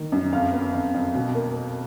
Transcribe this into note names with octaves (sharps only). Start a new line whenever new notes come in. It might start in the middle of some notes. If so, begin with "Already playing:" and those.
Already playing: D#3 A#3
F#2
F2 F5
B3
F2
F2
B2
A#3